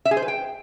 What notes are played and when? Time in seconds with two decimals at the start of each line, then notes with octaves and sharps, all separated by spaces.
0.05 E5
0.11 G#4
0.17 C5
0.22 B4
0.28 G5